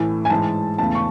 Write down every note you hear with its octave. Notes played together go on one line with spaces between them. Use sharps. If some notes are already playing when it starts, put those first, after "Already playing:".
Already playing: A2 E3 A3
G#5
G#2 E3 G#3 A5
E2 C#3 E3 A3 A5
C#6